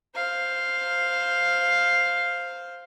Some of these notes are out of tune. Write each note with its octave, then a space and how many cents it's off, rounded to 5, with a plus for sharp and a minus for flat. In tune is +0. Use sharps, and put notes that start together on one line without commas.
C5 +0 F5 +0